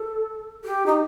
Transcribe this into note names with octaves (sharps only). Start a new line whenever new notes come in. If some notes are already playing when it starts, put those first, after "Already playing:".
Already playing: A4
G4
D#4